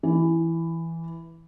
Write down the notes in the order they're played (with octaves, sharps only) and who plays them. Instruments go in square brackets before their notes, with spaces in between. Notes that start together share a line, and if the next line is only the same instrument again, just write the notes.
[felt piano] E3